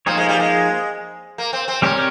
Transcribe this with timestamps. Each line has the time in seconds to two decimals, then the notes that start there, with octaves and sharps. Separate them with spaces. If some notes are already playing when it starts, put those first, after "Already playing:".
0.06 F3 A#3 C4 D#4 G#4 C#5
0.17 G#3
0.29 G3
0.40 G#3
1.38 A#3
1.53 C4
1.68 C4
1.82 G3 C4 C#4 G4 A#4 C#5